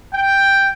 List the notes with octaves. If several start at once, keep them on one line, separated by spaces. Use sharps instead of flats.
G5